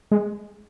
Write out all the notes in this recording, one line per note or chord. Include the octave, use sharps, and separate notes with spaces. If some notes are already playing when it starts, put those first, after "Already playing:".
G#3